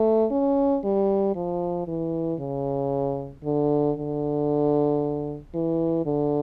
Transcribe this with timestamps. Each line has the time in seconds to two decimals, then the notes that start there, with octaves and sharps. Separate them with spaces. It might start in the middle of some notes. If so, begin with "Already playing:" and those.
Already playing: A3
0.31 C#4
0.84 G3
1.36 F3
1.88 E3
2.40 C#3
3.44 D3
3.97 D3
5.54 E3
6.06 D3